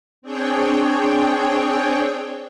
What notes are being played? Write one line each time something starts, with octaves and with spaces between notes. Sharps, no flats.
C4 D4 G#4 C#5 G5